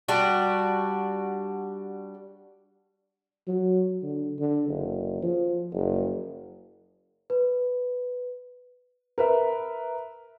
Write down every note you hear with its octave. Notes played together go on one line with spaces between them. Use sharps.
G3 D4 F#4
F#3
D3
D3
F#1
F3
F#1
B4
A#4 B4 E5